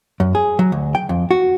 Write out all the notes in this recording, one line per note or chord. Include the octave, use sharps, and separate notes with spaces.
F#2
G#4
F#3
D2
G5
F2
F#4